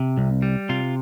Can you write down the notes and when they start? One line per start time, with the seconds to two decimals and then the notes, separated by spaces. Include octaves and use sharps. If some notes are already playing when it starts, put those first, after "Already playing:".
Already playing: C3
0.18 C2
0.42 G3
0.69 C3 F4